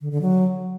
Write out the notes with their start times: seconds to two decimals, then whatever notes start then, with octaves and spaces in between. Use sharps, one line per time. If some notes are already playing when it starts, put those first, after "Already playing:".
0.01 D3
0.11 D3
0.21 F#3